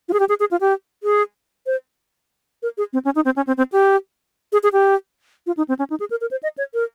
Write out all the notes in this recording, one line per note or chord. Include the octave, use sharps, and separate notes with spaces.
F4
G#4
G4
G#4
G#4
F4
G4
G#4
C5
A#4
G#4
C4
C#4
D#4
C4
C#4
C4
C4
G4
G#4
G#4
G4
F4
D#4
C4
C#4
D#4
G#4
A#4
A#4
C5
D#5
C#5
A#4